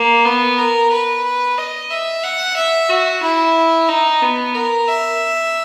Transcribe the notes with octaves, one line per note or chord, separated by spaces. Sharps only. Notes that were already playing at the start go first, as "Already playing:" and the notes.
Already playing: A#3
B3
A#4
B4
D#5
E5
F#5
E5
F#4
E4
D#4
B3
A#4
E5